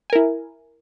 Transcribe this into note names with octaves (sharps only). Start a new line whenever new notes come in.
E4 A#4 G#5